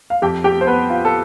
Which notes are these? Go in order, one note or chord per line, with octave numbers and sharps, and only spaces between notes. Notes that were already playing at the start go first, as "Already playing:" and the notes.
F5
F2 G4 G5
G4 G5
C5
B3 B4
F4
A4